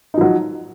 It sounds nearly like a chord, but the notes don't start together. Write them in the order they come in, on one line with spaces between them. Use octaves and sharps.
D#4 F3 F#3